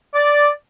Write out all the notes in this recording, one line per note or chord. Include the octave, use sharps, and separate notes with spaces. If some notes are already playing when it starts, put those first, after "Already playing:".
D5